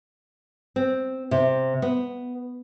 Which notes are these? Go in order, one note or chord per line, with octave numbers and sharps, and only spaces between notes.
C4
C3
B3